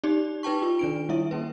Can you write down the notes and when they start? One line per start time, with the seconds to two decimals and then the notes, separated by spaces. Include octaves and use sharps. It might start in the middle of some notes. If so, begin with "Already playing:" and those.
0.04 D#4 G4 D5
0.43 D#4 B4 G5 A5 C#6
0.62 F4
0.79 D#3 D4 D7
1.09 G3 E4 E5
1.31 A#3 C#4 B4